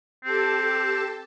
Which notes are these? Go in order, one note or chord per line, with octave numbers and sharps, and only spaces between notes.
C4 G4 A4 A5